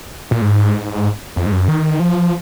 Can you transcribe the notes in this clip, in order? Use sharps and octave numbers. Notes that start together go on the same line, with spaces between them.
A#2
G#2
F2
G#2
F#2
D#3
F3